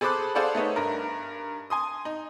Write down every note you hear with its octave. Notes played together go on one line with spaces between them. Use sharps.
G#4 A4 C5 B5 D6 F#6
G#4 A4 C5 D5 F5 F#5
A3 B3 D#4 C#5
G2 A#4
G#5 C6 D#6
D#4